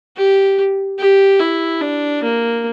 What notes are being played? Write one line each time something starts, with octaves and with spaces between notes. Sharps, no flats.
G4
G4
E4
D4
A#3